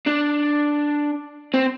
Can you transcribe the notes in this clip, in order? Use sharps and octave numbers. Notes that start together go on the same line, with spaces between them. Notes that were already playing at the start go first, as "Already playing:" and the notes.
D4
C4